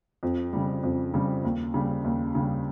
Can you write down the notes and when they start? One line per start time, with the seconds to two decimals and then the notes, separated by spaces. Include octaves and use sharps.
0.23 F2
0.53 C#3 G3
0.83 F2
1.14 C#3 G3
1.44 D#2
1.74 C#3 G3
2.04 D#2
2.35 C#3 G3